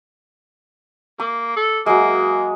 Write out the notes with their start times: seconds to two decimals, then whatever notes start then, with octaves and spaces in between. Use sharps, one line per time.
1.20 A#3 D6
1.56 A4
1.86 F#3 G#3 A#3